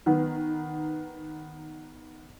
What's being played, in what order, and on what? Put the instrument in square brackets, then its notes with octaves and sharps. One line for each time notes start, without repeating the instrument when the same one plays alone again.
[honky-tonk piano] D#3 B3